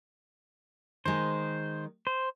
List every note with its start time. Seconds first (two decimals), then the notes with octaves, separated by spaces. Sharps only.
1.05 D#3 G#3 C5
2.07 C5